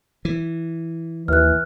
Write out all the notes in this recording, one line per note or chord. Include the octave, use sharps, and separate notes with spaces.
E3
D#2 E3 F6 F#6